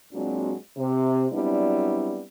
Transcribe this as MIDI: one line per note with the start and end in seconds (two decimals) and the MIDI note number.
0.12 0.53 46
0.12 0.53 54
0.12 0.53 56
0.12 0.53 60
0.12 0.53 62
0.12 0.53 66
0.77 1.25 48
1.31 2.22 54
1.31 2.22 55
1.31 2.22 59
1.31 2.22 60
1.31 2.22 62
1.31 2.22 64